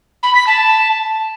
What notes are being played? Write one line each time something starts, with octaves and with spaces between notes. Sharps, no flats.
B5
B6
A5